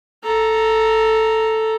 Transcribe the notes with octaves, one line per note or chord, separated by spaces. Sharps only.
A4 A#5